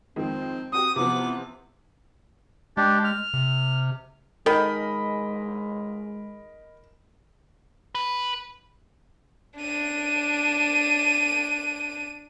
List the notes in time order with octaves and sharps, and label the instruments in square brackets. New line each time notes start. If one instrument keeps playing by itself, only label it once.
[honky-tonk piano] F2 D#3 G#3 [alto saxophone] C4
[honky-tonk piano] C4 F#4 G4 [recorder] D#6
[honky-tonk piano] C3 E3 F3 [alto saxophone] B3 [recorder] D6
[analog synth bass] G#3 [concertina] D4 G4
[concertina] F6
[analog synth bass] C3
[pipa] D#3 [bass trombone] G#3 [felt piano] A#4 [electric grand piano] D#5 B5
[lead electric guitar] B4
[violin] D4 D#7